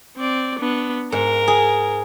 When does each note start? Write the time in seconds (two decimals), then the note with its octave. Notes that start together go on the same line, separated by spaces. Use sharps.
0.17 C4 D5
0.59 B3 D4
1.12 G#2 A#4 F#5
1.48 G#4